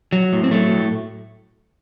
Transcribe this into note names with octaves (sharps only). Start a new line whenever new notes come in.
F#3
A2
C4
F#3 A3
A2